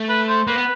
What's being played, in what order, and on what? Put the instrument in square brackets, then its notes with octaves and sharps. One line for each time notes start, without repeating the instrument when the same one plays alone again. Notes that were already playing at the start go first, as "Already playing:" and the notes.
Already playing: [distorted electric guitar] A3
[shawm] B4
C5
[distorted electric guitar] A#3 [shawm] B4
[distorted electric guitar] B3